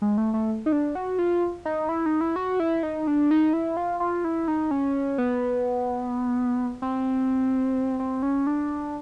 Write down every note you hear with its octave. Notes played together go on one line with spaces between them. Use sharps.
G#3
A3
A3
D#4
D4
F#4
F4
D#4
E4
D#4
E4
F#4
E4
D#4
D4
D#4
E4
F4
F4
E4
D#4
C#4
B3
C4
C4
C#4
D4